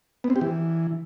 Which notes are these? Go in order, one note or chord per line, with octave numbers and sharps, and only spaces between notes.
B3
C4
G4
E3